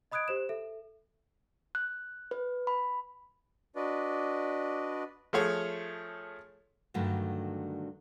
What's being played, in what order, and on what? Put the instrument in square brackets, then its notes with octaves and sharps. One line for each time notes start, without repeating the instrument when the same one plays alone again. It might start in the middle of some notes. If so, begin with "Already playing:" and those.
[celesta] D#5 B5 D#6 F#6 G#6 D7
G4 C5 E7
A4 E5
[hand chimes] F#6
B4
B5
[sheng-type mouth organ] D4 F#4 B4 D5 D#5
[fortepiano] F3 A3 G#4 C#5
[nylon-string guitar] G2 D3 D#3 F#3 A3